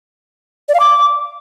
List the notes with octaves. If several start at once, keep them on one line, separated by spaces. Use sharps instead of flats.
D5
F5
D6